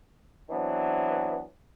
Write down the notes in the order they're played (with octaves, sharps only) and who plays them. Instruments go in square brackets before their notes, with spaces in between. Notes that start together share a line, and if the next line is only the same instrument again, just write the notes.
[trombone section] E3 F#3 B3 C4 D4